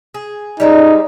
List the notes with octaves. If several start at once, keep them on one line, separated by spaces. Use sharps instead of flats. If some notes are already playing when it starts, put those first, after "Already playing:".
G#4
G3 G#3 C4 D#4